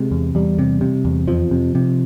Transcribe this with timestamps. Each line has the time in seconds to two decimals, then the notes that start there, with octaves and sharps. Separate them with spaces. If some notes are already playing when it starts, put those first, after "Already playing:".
Already playing: C3 G#3
0.11 E2
0.35 E2 G3
0.59 C3
0.81 C3
1.05 E2
1.28 F2 F3
1.51 C3
1.75 C3